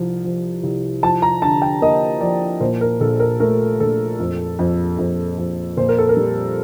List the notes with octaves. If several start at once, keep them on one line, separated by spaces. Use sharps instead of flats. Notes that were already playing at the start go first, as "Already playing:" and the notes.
Already playing: C2 F3
F3
C2
F3 A5
A#5
D3 A5
G5
A#3 D#5
F3 D5
A#2 C5
A#4
A#1 A4
A#4
A3 A#4
A#1 A4
F2
F2
F2
F2
A#2 C5
A#4
A4
A#4
G3